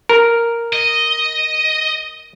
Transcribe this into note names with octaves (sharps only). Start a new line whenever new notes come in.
A#4
D#5